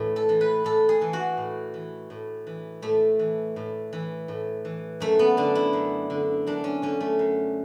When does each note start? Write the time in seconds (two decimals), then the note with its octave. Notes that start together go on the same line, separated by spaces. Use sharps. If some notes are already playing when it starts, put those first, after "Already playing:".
Already playing: A2 E3
0.16 A4
0.29 E3
0.41 B4
0.65 A2 A4
0.89 G#4
1.01 E3
1.13 F#4
1.37 A2
1.74 E3
2.10 A2
2.47 E3
2.82 A2 A3
3.19 E3
3.56 A2
3.93 E3
4.28 A2
4.65 E3
5.00 F#2 A3
5.19 B3
5.37 D3 D4
5.55 E4
5.73 F#2
6.10 D3
6.47 F#2 D4
6.64 C#4
6.82 D3 C#4
7.01 A3
7.19 F#2